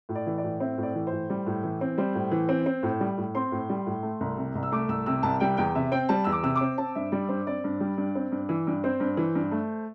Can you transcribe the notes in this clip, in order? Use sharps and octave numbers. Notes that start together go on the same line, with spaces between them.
A2
D5
E3
D5
A2
C4 E5
A2
D5
E3
A2 C5
G3
A2
E3
C4
G3 C5
A2
E3
C4
C4
A2
G3
A2
C4 C6
A2
G3
A2
A3
C2
C3
C2
E6
A3 D6
C2 E6
C3 E6
C2 A5
G3 G5
E2 G5
C3 E5
C4 G5
G3 A5
E2 E6
D6
C3 E6
D6
C4
C4 A5
G2 E5
G3 D5
G2 C5
C4 D5
G2
G3
G2
C4
G2
E3
G2
C4 C5
G2
E3
G2
A3